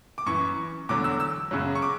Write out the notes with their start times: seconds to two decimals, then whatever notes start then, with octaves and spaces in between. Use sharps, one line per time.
0.18 D6
0.26 F#2 E3 C#6
0.89 E2 D3 F#3 D6
1.04 E6
1.20 E6
1.51 F#2 C#3 F#3
1.75 C#6
1.82 D6